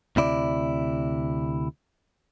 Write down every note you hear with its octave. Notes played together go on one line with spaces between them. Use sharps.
D2 C3 E4 D5